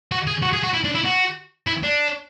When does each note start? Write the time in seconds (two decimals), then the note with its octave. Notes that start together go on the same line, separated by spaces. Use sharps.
0.12 F#4
0.27 G#4
0.42 F#4
0.53 G#4
0.63 F#4
0.73 E4
0.84 D4
0.94 E4
1.04 F#4
1.67 E4
1.83 D4